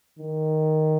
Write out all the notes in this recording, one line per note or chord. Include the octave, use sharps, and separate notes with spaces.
D#3